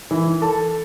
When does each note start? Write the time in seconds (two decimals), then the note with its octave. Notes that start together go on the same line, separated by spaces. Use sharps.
0.11 E3
0.42 A4